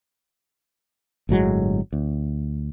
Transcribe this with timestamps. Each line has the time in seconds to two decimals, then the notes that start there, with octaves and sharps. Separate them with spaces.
1.29 G1 A2 F#3 G#3
1.93 D2